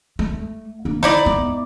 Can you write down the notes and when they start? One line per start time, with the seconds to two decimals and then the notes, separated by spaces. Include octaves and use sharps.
0.19 A3
0.85 A#3 D4
1.03 D#3 D#4 E4 D5
1.26 B3